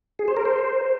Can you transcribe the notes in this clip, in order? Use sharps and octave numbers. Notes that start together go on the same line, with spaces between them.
G#4
C5
A#4
C5